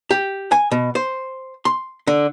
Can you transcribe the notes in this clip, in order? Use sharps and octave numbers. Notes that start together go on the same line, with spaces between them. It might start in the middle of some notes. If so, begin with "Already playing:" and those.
G4
G#5
B2
C5
C6
D3